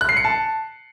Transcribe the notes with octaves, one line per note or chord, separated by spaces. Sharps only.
F#6
C7
C#7
A5